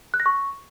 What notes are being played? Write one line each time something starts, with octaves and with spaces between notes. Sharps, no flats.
F#6
A#6
C#6